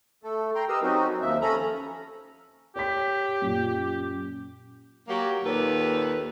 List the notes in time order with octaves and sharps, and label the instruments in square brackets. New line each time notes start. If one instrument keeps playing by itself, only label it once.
[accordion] A3 A4
G5 A#5 C6
G4 A#4 B4 D#5 E6
F#3 C4 C#4 D#4 F#4
D#2 F3 E5
C#4 A4 A#5 B5
[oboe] G4 [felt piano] C#5 B6
[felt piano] F#2 A#2
[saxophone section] F#3 A#3 F#4 G4
D#2 A#2 A4 B4